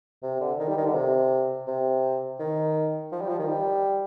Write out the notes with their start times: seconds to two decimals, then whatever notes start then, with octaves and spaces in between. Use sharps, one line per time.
0.23 C3
0.40 D3
0.59 D#3
0.68 G3
0.77 D#3
0.85 D3
0.94 C3
1.67 C3
2.39 D#3
3.12 F3
3.21 G3
3.29 F3
3.39 D#3
3.48 G3